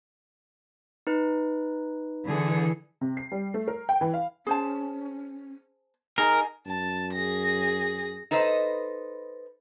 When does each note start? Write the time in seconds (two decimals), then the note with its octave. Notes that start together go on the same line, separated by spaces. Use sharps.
1.07 D#4 B4
2.26 D3 E3 G#4 C#7
3.01 C3
3.17 C7
3.32 G3
3.54 A3
3.68 A#4
3.89 G5
4.01 E3
4.14 F5
4.47 C#4 G#4 C5 A5
6.18 D#4 G#4 A#4 G#5 A#5
6.67 F#2 A5
7.13 G#4 A#6
8.31 D#4 A4 B4 C5 D#5